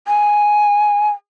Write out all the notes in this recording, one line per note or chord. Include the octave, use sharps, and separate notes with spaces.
G#5